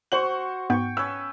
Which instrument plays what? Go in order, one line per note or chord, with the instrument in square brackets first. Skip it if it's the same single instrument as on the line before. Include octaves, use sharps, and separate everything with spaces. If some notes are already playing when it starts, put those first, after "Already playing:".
[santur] F#4 C#6 [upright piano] C5 F#7
[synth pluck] G#2 B3 [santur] G5 C#6
[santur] C#4 B4 [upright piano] E6